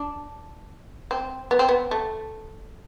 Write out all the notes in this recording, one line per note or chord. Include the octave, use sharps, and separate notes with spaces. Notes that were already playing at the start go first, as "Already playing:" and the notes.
Already playing: D4
C4
B3
C4
B3
A3